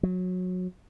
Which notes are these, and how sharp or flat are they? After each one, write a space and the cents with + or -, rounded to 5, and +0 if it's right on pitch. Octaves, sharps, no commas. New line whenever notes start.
F#3 -20